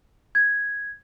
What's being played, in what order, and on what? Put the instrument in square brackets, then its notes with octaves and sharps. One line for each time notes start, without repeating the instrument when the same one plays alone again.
[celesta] G#6